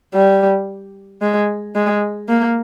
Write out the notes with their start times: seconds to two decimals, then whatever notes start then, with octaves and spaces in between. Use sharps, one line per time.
0.14 G3
1.22 G#3
1.75 G#3
2.29 A#3